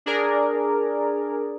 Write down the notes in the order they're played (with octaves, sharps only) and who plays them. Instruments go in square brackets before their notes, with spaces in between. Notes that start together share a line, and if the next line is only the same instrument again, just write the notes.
[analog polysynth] D4 G#4 A#4 D5